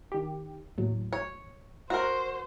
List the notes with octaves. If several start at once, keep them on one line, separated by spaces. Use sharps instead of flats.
D#3 G4
D#2 A2 F#3
C#5
F#4 A#4 C5